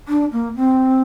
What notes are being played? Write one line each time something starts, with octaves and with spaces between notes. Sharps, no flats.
D4
A#3
C4